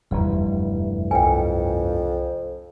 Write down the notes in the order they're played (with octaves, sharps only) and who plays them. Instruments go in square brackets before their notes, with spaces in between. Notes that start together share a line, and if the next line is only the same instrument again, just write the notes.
[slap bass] F1 G2 E3 [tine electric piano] E2 G3
[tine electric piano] C2 [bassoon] F2 [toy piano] G5 G#5